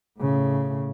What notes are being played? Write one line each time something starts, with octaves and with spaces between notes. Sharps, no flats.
A2 C#3